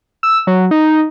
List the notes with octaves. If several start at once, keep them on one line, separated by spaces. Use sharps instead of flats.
E6
F#3
D#4